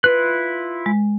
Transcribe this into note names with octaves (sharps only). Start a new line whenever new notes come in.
E4 F4 B4 F#6
G#3